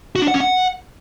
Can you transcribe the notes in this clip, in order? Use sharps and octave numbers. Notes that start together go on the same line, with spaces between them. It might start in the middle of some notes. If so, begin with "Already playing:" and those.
F#4
D4
F#5
C#4
F#5